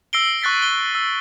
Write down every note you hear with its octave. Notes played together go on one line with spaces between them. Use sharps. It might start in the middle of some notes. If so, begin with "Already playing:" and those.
E6 A#6 C7 D7 G7
C#6 F#6 A6 B6 C7
D7 G7
E6